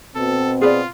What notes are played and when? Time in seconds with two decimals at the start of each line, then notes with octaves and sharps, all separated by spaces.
0.15 B2 C4 A4
0.61 F4 G#4 B4 D5